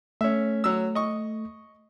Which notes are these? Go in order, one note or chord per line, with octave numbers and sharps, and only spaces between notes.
A3 C#4 E5
F#3 E6
D#5 C#6